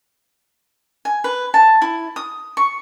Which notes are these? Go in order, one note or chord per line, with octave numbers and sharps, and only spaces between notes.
G#5
B4
A5
E4
D#6
C#6